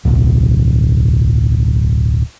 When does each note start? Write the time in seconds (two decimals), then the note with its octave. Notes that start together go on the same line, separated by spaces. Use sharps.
0.05 D1 B1